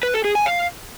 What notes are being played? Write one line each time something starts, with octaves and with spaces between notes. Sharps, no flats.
B4
A4
G#4
G#5
F5